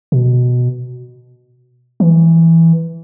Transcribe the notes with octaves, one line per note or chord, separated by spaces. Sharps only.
B2
E3